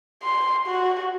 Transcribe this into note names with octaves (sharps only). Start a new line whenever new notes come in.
C6
F#4